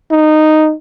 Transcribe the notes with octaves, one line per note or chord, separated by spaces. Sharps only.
D#4